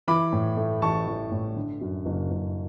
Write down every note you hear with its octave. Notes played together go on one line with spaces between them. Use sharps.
E3 B5 D6
A2
A3
A1 A5 C#6
E3
A2
D3
F#2
F#1
F#1